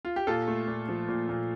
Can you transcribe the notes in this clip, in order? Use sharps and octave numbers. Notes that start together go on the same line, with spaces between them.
F4
G4
A#2 F4 A4
A3
A#2
F3
A#2
A#2